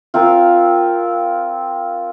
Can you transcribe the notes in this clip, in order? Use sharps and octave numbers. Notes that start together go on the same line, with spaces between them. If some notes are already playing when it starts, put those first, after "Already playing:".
C4 F4 A#4 F5